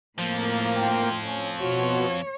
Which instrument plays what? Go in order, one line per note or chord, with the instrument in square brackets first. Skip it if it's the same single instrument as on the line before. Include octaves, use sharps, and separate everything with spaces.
[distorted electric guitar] F2 F3 [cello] A2 [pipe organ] A#3
[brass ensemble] D2 F4 G5
C#4
[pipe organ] B2 [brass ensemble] F4 F#4 [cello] C#5